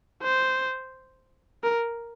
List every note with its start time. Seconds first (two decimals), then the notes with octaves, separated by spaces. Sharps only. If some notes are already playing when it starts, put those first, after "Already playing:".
0.23 C5
1.64 A#4